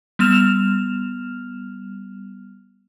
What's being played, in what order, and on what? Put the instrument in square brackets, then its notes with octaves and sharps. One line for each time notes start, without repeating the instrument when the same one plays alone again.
[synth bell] G3 B3 F6 E7 F7